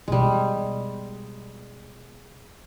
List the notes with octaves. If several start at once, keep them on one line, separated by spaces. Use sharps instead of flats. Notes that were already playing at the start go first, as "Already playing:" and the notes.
B2 G3 G#3 B3